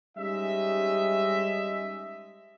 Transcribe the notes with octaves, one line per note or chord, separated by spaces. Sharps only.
G3 G#3 C#4 D#4 D#5 E5